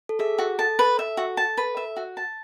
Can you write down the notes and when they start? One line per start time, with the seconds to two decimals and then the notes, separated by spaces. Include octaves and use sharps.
0.09 A4
0.19 G#4 E5
0.38 F#4
0.59 A4 A5
0.79 B4
0.99 E5
1.17 F#4
1.37 A5
1.57 B4
1.77 E5
1.96 F#4
2.17 A5